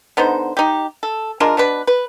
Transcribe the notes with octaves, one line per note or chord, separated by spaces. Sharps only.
D3 B3 D#4 C5
D#4 G4
A4
G#3 D4 F4 A#4
B2 D4 B4
B4